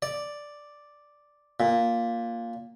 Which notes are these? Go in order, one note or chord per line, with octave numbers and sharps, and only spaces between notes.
D5
A#2